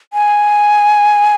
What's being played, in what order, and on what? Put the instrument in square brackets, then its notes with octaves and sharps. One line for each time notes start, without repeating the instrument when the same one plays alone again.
[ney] G#5